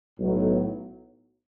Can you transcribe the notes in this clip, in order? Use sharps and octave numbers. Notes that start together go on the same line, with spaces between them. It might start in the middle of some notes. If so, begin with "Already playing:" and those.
B1 A2 F#3